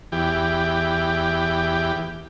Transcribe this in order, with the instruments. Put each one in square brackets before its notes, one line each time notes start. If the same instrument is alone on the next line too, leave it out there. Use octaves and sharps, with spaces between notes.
[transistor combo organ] E2 G4